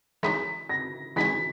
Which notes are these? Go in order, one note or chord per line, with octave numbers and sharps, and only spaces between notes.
E3 G#3 D#4 G#4 C#5 B6
A#6
E3 G#3 D#4 G#4 C#5 B6